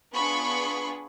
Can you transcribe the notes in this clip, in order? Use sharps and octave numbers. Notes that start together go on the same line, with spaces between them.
B3 D4 F4 G#4 B5 C#6